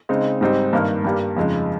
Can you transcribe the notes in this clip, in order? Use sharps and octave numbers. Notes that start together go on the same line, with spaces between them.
C#3 G#3 C4 D#4
G#2 G3 C4 D#4
G2 D#3 A#3
G2 G3 A#3
F2 C#3 G#3 D#4